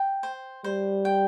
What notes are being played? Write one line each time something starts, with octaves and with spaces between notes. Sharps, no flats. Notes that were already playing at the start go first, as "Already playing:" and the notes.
Already playing: G5
C5
G3 C5
G5